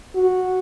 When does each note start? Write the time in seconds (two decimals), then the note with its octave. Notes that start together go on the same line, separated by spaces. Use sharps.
0.15 F#4